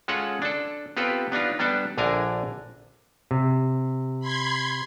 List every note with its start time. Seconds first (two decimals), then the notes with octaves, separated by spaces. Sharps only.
0.08 G#3 C#4 F4 A4 F#5
0.42 D4 A4
0.97 B3 C4 F4 G4 A4 B4
1.32 B3 D4 D#4 F4
1.59 G3 B3 D4 A4
1.98 A#1 D3 D4 A#4 G#5
3.31 C3
4.20 B5 C6 G#6